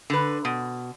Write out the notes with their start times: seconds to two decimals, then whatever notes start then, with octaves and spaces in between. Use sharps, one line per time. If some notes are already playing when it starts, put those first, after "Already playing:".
0.10 D3 B4
0.45 B2